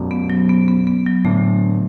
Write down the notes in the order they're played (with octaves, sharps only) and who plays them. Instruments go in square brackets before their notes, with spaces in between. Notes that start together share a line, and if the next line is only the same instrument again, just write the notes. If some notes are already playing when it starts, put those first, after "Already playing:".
Already playing: [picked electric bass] F#2 B2
[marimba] B3
F#3
B3
B3
B3
F#3
[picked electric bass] A2 D3 [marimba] A3